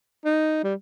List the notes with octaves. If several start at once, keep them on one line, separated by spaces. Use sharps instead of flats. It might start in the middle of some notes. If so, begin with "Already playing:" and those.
D#4
G3